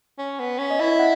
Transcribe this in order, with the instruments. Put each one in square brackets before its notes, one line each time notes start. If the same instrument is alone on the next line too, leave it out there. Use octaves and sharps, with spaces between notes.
[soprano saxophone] C#4
B3
C#4
[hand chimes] D#5
[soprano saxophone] E4 [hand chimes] E5
[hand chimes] F#5